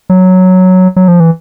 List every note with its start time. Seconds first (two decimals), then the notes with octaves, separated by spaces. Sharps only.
0.10 F#3
0.96 F#3
1.08 F3
1.20 E3